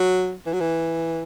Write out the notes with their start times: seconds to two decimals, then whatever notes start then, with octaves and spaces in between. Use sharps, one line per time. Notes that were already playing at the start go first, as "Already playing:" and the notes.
Already playing: F#3
0.46 E3
0.53 F#3
0.60 E3